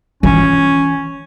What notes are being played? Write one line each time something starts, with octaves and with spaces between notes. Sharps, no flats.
E3 C#4 F4